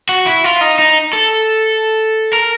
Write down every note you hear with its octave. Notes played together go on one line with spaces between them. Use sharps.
F#4
E4
F4
D#4
D#4
A4
A#4